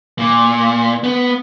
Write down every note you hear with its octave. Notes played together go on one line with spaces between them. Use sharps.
A#2
B3